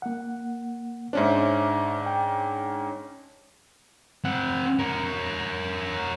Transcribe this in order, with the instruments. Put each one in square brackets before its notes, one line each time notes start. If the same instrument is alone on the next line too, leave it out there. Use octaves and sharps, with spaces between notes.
[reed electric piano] A#3 F#5
[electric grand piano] G#2 C#4 D4 [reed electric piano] C5 C#5 E5
[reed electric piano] G5
[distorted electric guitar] C4 F#5
A#4 C#5